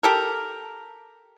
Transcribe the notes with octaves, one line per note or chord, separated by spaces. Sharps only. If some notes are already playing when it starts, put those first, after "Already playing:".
G4 A4 A#4